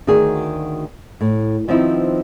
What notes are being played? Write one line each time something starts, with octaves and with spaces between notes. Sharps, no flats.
D2 D#3 F#4 G#4
A2
D#3 F3 B3 C4 D#4 E4